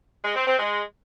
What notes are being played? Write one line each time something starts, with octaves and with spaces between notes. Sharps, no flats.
G#3
C4
C4
G#3